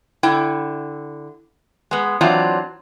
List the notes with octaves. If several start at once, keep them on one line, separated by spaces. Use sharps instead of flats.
D3 E4 G5
G#3 B3
E3 F#3 C4 D4 F4